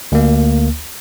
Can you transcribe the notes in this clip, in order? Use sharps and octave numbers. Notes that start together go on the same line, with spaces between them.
D2 A#3